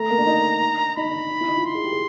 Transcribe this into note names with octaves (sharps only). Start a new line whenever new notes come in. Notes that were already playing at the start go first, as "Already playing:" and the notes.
Already playing: A3 A#5
A#3
D4
D#4
D#4 B5
D4
D4
D#4
E4
D#4
F4
C6
G#4
G4
G#4